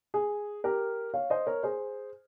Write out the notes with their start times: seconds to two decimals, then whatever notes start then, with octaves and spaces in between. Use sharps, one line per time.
0.14 G#4
0.64 G4 A#4
1.14 C#5 F5
1.30 C5 D#5
1.47 A#4 C#5
1.63 G#4 C5